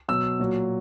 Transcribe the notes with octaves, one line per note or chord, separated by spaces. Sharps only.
B2 F#3 E6
A#2 F#3